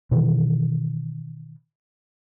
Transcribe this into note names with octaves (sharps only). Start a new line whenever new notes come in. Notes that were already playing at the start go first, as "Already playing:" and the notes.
B2 D#3 E3